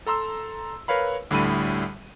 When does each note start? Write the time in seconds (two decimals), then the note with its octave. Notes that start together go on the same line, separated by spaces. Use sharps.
0.06 A4 A#5 C6 E6
0.88 A#4 B4 C#5 F5 B5
1.31 D2 A2 D3 G3 B5 D#7